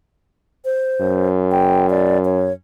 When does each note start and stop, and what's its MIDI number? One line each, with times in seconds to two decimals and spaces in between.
0.65 1.29 72
1.01 2.51 42
1.51 1.87 79
1.90 2.18 74
2.25 2.53 73